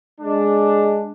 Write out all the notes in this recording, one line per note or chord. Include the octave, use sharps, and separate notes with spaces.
G#3 D4